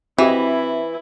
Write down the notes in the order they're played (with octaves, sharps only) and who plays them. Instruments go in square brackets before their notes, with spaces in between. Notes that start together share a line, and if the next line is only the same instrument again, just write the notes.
[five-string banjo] E3 [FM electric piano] C4 [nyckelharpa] E4 [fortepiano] F#4 G4 D#5